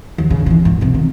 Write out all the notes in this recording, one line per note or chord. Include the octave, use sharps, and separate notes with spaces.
D#2
C#3
D#3 E3
G#2
D2 C3
D#3